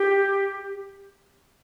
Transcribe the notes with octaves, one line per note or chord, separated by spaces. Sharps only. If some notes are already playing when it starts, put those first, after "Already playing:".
Already playing: G4